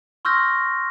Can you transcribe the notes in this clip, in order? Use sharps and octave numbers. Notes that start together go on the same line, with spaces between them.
C6 C#6 E6 F6 G6 A#6